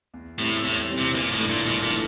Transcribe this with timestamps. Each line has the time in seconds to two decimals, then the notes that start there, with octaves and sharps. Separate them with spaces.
0.14 E2
0.39 A2 E3 G3 C4
0.64 E2 A2
0.89 E3 G3 C4
0.98 C3
1.14 G1 A#2
1.32 A2
1.40 G2 E3 A3 D4
1.48 A#2
1.65 G1 A#2
1.83 A#2
1.90 E3 A3 D4